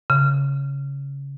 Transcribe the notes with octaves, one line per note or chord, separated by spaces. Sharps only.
C#3